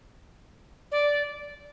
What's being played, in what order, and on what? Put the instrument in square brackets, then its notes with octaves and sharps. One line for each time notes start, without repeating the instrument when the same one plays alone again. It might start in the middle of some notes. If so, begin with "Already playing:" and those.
[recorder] D5